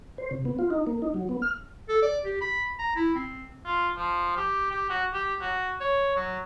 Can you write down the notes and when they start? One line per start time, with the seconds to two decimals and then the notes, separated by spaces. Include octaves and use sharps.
0.18 C5
0.31 C3
0.45 B3
0.59 F4
0.70 D#4
0.87 A#3
1.02 D#4
1.14 F#3
1.29 B3
1.42 F6
1.89 A4
2.02 D5
2.25 G4
2.41 B5
2.79 A#5
2.96 E4
3.15 C4
3.66 F4
3.97 F3
4.37 G4
4.71 G4
4.90 F#4
5.14 G4
5.41 F#4
5.80 C#5
6.16 F#3